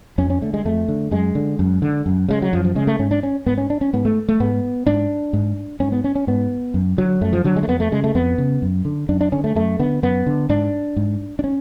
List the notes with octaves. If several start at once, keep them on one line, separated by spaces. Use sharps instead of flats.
F2 C#4
C#4
D3 A3
G#3
F2 A3
D3
F#2 G#3
D3
F#2
D3
F#2
C#3 G#3
F#3
F#2 F3
F3
C#3 G#3
A3
G#2 C#4
D4
C#4
G#2 B3
C#4
D4
C#4
G#2 B3
A3
A3
G#2 B3
G#2 D4
G#2
G#2 C#4
B3
C#4
C#4
G#2 B3
F#2
D3 F#3
F#2 A3
F3
D3 F#3
G#3
A3
F2 B3
A3
C#3 G#3
A3
F2 B3
C#3
F#2
D3
F#2 D4
D4
D3 C#4
A3
F#2 A3
D3 B3
F#2 B3
D3
G#2 D4
G#2
D4
C#4